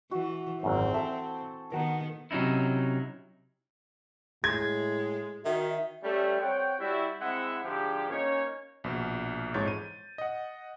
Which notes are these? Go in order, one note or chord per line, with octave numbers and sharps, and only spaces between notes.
E3 F#4
G#1 F#2 C4
A4 E5 G#5
D#3 B3 F#4 A#4
C3 F#3 C#4 D#4 E4
A2 G#3 G#6
D#3 F#4 E5
G3 A3 C#4
C4 C#5 F#5 G5
G3 E4 F#4
G#3 C4 E4 E5 F#5
G#2 D3 F3 G4
A#3 C#4 D#4 C#5
A#1 B2
F2 G#2 E3 C#5 G6 A6
D#7
D#5 F#5